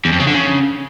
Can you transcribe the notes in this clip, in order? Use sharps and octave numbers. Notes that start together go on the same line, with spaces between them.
E2
F2
C#3
D3
C#3